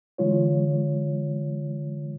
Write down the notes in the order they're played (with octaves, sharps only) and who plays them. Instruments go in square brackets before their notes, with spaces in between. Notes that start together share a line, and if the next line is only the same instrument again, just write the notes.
[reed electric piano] D3 E3 G#3 F4 C#5